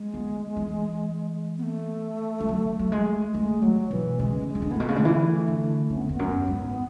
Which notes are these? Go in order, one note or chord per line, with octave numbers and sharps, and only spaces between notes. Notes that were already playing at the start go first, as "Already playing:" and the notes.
Already playing: G#3
B3
E3
B3
A3
G#3
F#3
F#3
G#3
G#3 A3
F#3 G#3
B2 E3
C#3 G#3
G#3
E3
D3
A2 B3
B2 A3
C#3
D3 G#3
E3 A3
D3
C#3 C#4
B3
A3
E2 B3
F#2
G#2